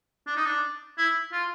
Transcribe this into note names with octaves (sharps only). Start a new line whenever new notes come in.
D4
D#4
D4
E4
F4